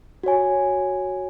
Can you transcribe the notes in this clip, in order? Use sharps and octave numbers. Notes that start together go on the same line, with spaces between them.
F#4 C#5 G#5